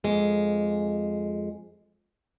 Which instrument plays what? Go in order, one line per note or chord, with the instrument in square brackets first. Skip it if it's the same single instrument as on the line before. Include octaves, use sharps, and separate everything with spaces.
[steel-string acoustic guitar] F2 G#3